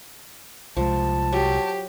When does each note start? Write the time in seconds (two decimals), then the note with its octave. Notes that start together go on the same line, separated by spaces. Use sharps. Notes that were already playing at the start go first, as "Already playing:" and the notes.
0.77 C2 F3 G#3 A5
1.32 F#3 G4